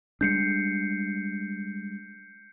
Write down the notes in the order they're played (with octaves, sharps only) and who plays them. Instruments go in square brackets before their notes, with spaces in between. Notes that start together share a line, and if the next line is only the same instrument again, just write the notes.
[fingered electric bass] G3 G#3 D4 [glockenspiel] G6 C7 C#7